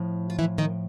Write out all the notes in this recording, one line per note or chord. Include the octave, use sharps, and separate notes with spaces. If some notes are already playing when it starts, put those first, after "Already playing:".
Already playing: A2 F3
F4
E3 E4
D#3 D#4